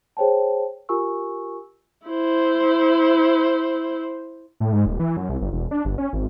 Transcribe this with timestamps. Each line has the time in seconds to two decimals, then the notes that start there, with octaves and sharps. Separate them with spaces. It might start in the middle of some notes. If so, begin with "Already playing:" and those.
0.17 G#4 C5 C#5 G5 A5
0.89 F4 G4 A#4 G#5 C#6 E6
2.07 E4 C5
4.60 A2
4.72 G#2
4.86 D#1
5.00 E3
5.17 F#2
5.29 C2
5.41 G1
5.52 E1
5.71 D4
5.85 G1
5.98 C#4
6.13 G#1